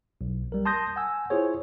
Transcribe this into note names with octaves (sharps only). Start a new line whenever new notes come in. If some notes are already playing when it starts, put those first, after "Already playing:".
B1
G3 A#4
A5 C6 D#6 G6 A#6
F#5 G#5 E6
E4 F4 G#4 C5 C#5